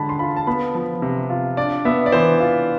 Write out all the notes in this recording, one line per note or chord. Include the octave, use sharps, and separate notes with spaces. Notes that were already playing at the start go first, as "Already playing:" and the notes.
Already playing: D3 G#3 D4 A5 B5
C6
F4 B5
A5
B3 B5
F3
C3
F4
D4 D5
B3 E5
D5
E3 C5
F4